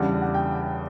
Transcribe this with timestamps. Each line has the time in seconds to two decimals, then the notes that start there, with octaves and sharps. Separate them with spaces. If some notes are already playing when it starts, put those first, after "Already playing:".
Already playing: E2 C#3 G3 D4 F#5
0.22 F#5
0.34 G5